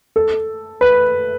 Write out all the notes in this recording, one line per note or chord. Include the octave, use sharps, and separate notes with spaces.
A4
B4